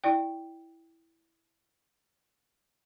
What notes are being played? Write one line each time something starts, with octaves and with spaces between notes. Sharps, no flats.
E4 D5 G5